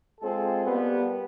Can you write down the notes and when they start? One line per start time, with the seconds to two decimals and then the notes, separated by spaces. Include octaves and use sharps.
0.21 G#3 C4 F4 G#4 A4
0.65 G3 A#3 B3